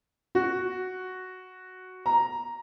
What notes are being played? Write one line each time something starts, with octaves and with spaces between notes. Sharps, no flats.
F#4
A#5